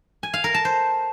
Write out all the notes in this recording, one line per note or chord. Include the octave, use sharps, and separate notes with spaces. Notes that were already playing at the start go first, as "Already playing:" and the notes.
G#5
F5
A#4
A5
C5